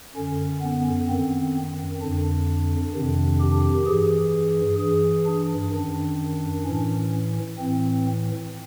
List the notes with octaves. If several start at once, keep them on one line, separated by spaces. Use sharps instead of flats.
F#2 D3 C#4
B3
F#2 D#3 C4
F2 D3 D4
F2 C3 D#3
G4
G2 E3 G#4
G2 E3 G#4
D4
F#2 D#3 D4
A2 E3 C#4
A2 E3 C4